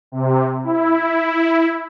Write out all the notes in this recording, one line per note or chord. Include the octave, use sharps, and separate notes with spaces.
C3
E4